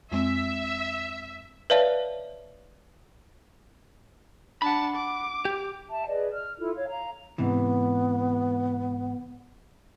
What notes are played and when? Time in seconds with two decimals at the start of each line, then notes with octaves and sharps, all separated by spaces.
0.12 F2 G#3 C4 E5
1.70 B4 C#5 D5 E5 F5 A5
4.62 D4 F#5 A5 B5
4.96 D6
5.45 G4
5.89 E5 A5
6.06 G#4 B4 D5 D#5
6.32 F6
6.58 E4 F4 A4
6.76 C#5 F5
6.88 F5 A#5
7.38 G#2 C3 E3 B3